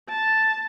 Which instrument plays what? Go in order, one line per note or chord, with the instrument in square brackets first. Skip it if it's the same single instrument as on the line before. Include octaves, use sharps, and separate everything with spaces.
[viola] A5